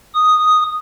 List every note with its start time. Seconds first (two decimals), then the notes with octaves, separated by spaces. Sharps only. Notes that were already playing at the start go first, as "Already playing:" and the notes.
0.15 D#6